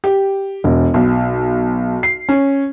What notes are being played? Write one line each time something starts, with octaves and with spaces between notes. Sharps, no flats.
G4
E1
B1
C7
C#4